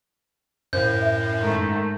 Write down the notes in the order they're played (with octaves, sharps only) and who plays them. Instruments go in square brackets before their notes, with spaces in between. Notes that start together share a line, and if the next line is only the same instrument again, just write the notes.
[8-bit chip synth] F#2 A2 [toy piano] C5 F5 [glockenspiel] G6
[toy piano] E5
[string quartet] G#2 D#3 A3